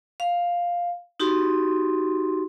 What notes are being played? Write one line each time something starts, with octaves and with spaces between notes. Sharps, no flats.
F5
D#4 F#4 G4 C6